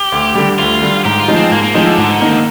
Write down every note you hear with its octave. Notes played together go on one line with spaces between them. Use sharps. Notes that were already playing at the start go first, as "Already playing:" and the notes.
Already playing: G4
D2
D3 G3
D2 F4
D3 G3
G#2 G4
F4
F3 G#3 D#4
C4
G#2 A#3
A#3
D#3 F3 G#3 D#4
D3
G#2
D#3 A#3 D#4